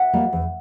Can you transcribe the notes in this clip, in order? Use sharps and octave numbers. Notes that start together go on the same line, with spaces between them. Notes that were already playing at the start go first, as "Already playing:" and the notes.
Already playing: E5 F#5
G3 A#3
E2